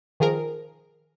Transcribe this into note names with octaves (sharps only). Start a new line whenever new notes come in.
D#3 F3 G#4 A#4